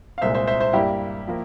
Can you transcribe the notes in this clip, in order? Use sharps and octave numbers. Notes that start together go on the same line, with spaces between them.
F5
C2 A#2 G#3 C5 E5
C5 E5
C5 E5
C5 E5
G2 G3 A#3 E4 G4
F3 A#3